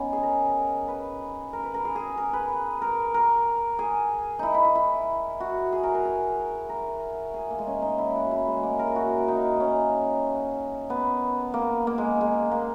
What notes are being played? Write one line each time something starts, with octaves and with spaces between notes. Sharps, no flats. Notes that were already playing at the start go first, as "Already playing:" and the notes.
Already playing: B3 C#4 D#4
G#4
A#4
B4
A#4
B4
A#4
G#4
G#4
A#4
B4
A#4
A#4
G#4
D#4 E4
E4
E4
E4
F#4
G#4
A#4
A#4
G#4
A#4
G#4
A#3
G#3
C#4
D#4
E4
F#4
E4
G#3
A#3
A#4
G#4
F#4
D#4
C#4
B3
A#3
A#3
G#3
G#3
A#3